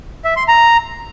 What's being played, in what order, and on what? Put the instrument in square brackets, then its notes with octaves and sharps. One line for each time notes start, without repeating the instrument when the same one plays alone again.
[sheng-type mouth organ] E5
C6
A#5